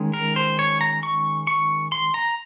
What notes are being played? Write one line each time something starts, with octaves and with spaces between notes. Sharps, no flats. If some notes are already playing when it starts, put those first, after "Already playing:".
Already playing: D#3 G#3 C#4
A#4
C5
C#5
A#5
C#6
C#6
C6
A#5